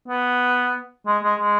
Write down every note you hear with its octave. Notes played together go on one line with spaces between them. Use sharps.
B3
G#3
G#3
G#3